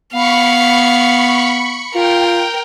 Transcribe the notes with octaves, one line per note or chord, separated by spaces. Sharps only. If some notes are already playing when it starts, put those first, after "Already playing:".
B3 F5 B5 C#6 C#7
F4 A#4 G5